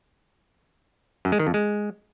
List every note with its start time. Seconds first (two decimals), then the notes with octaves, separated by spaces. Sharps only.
1.25 F#2
1.32 G#3
1.39 D#3
1.47 F2
1.54 G#3